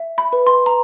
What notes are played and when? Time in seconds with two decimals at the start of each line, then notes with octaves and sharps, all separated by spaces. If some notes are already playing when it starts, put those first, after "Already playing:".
Already playing: E5
0.18 B5
0.33 B4
0.47 C6
0.66 A#5